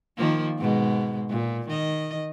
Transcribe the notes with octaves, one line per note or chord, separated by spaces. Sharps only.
D#3 F3 A#3
G#2 B2 G#3
A#2
D#3 D#5